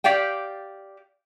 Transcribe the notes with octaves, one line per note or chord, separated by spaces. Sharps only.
G4 D5 F5 G5